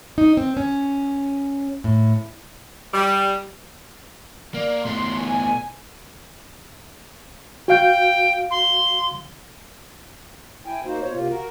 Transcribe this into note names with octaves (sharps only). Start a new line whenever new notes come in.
D#4
C4
C#4
A2
G3
A#3 D5
B2 A3 C6
G#5
F#4 F5 G5 G6
C6
E4 G5 G#5
A#3 D#4 F#4 C5
B2 C5 C#5
C3 A#3 F4
F#4 A#4